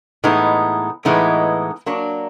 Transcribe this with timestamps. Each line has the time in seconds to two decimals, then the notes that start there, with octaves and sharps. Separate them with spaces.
0.24 A2 E3 G#3 B3 D#4
1.05 A2 E3 G#3 B3 D#4
1.86 F#3 A#3 D4